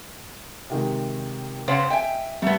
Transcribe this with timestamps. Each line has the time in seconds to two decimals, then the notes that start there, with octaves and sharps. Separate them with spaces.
0.70 C3 D#3 G#3
1.68 C#3 B3 C5 C#5
1.90 D#5 E5 G5 G#5
2.42 G2 A3 B3